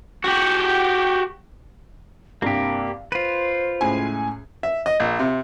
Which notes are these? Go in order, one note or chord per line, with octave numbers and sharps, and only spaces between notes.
F#4 G4
C2 G2 A#3 G4 F5
F4 B4 C5 D#7
C#2 A2 G#5
E5
D#5
A#1
C3